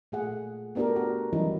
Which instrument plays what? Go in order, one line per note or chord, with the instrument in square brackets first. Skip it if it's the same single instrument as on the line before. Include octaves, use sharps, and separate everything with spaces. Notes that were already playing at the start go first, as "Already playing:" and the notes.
[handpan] A#2 A3 G#4 F#5
A3 B3 D4 F#4 G4 A#4
F#4
E3 F#3 G3 C#4 D#4 E4